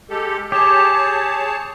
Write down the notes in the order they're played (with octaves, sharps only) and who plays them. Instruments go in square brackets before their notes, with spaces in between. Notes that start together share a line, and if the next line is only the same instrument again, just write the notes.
[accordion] G#3 G4 A4
[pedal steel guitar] G4 [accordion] G#4 C#5 A5